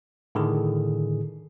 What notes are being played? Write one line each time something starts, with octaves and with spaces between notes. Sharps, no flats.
A2 D3 D#3 G#4